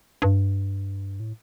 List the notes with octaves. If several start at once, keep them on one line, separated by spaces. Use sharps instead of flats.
G2
A2